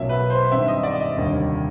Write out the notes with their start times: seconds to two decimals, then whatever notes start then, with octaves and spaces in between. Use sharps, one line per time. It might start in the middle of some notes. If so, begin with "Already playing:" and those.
Already playing: B1 B2 F#3 A#3 C#4 E5
0.09 B4
0.30 C5
0.51 G2 D#3 G3 C4 E5
0.68 D#5
0.83 D5
1.00 D#5
1.15 F1 D#2 D3 G3 A#3